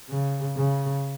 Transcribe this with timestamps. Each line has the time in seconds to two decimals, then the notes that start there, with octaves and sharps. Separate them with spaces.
0.10 C#3
0.57 C#3